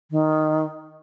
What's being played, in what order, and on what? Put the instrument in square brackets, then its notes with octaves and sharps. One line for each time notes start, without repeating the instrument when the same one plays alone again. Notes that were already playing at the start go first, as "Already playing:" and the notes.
[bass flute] D#3